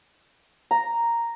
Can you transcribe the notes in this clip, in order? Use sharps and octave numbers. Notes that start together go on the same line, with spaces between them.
A#5